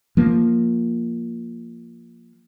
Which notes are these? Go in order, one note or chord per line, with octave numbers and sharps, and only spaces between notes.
F3 A#3